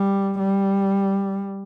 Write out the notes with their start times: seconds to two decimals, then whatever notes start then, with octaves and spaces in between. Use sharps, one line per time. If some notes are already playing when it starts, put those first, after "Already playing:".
Already playing: G3
0.39 G3